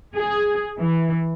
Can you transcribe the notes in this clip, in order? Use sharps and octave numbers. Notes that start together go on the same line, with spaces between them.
G#4
E3